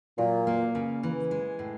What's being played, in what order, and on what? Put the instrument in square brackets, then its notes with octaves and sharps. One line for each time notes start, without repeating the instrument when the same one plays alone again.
[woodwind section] A#2 [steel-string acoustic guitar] F#3
[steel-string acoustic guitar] A#3
C#3
E3
G#3
A2